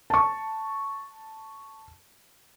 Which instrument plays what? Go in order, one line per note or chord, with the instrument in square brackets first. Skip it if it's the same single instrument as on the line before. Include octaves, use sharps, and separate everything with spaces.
[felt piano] A5 C#6